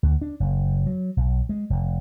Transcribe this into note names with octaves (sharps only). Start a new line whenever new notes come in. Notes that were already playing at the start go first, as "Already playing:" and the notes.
D2
D4
F#1
F#3
B1
G#3
F1